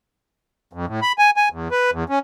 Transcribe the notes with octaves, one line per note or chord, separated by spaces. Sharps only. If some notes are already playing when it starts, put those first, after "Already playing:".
F2
A2
B5
G#5
G#5
E2
B4
E2
C#4